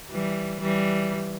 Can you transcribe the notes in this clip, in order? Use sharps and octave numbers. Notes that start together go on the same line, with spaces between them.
E3 G3
E3 G3